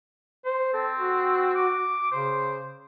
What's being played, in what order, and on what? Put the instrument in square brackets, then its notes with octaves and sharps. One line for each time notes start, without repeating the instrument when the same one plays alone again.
[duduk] C5
[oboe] C4 [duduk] A4
[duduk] F#4
[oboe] D6
[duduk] C#3 [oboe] C5